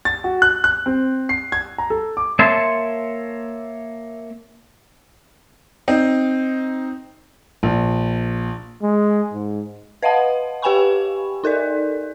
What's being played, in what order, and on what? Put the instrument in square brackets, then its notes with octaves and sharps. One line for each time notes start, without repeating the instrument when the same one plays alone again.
[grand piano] A6
F#4
F#6
F#6
C4
C7
G#6
A#5
A4
D6
[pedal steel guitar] A#3 C#5 E5 A5 C6
[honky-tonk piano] C4 D#4
[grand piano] A#1
[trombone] G#3
G#2
[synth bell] B4 D#5 F5 F#5 A5
G4 B4 G5 G#5 B5 C#6
D#4 A4 A#4 D5